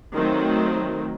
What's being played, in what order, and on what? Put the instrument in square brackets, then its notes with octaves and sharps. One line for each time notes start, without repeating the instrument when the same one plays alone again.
[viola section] D#3 F#3 A3 C4